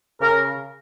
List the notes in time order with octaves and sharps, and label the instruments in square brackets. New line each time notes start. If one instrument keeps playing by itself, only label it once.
[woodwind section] C#3 A#4